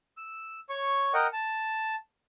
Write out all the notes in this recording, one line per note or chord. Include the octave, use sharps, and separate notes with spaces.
E6
C#5 C#6
A#4 D#5 F#5 G5
A5